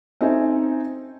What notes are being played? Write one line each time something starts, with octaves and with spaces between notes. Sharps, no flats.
C4 C#4 D#4 A4 E5 G#5